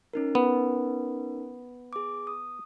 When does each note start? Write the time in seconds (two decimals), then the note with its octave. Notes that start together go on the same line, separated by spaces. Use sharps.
0.13 C#4 D#4 A#4
0.35 B3
1.93 G#4 D6
2.27 D#6